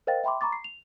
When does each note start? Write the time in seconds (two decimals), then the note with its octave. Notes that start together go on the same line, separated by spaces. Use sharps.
0.07 A#4 C5 D#5 F5 G5 A6
0.24 E5 G5 B5 C6 D6
0.41 A#5 B5 C#6 D6 A6
0.53 C7
0.64 F7